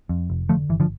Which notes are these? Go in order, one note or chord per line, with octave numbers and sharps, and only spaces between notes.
F2
F1
D3 F3 A3
G1 E3
D3 F3